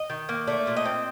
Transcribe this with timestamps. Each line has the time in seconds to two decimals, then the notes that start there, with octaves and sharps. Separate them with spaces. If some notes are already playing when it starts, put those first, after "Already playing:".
Already playing: D#5
0.10 D#3
0.29 A#3
0.47 A3 D5
0.67 A#2
0.76 D#5
0.85 C4